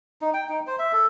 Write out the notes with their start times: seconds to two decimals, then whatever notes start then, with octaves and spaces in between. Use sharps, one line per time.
0.21 D#4
0.34 G5
0.49 D#4
0.67 C5
0.79 E5
0.92 A4